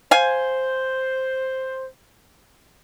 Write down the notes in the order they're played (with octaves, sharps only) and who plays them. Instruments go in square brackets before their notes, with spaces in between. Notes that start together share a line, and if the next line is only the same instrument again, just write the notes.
[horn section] C5 [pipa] F5 G#5